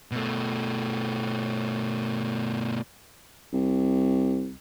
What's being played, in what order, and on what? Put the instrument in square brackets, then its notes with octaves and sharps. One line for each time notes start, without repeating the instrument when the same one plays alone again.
[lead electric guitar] B2 A3
[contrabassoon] C2